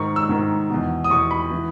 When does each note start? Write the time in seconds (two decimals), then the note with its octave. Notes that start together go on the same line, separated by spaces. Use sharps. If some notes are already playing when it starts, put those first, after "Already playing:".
Already playing: G#2 D#3 C#6
0.16 E6
0.29 G#2 D#3
0.69 E2 B2
1.04 D#6
1.10 E2 B2 C#6
1.31 B5
1.51 E3